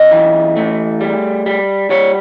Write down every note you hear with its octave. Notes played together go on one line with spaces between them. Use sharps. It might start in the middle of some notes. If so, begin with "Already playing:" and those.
Already playing: F#2 D#5
E3
A3
G3
G3
G3 C#5